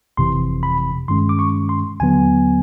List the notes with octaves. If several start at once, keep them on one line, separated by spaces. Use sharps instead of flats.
G1 F2 C3 E3 C6
B5
G2 D#3 G#3 C#4 C6
D6
C#6
C6
D#2 D3 F#3 B3 G#5